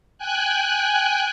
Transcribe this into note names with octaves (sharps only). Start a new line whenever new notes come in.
G5 G#5 F#6